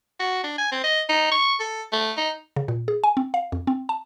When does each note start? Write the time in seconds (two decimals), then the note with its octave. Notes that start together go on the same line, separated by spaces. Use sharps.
0.20 F#4
0.43 D4
0.58 G#5
0.71 C4
0.84 D#5
1.09 D#4
1.31 C#6
1.60 A4
1.92 A3
2.17 D#4
2.56 C#3
2.68 A#2
2.88 G#4
3.04 G#5
3.17 C4
3.34 F5
3.52 F2
3.67 C4
3.89 A5